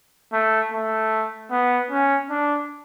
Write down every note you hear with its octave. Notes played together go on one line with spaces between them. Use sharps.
A3
A3
B3
C#4
D4